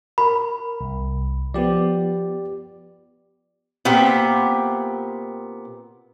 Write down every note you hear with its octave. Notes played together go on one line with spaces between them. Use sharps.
A#4 B5
C2
F3 B3 G4 D5
A#2 B3 C4 G4